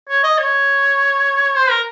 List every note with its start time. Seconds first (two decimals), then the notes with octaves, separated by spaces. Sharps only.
0.09 C#5
0.24 D#5
0.38 C#5
1.56 C5
1.70 A#4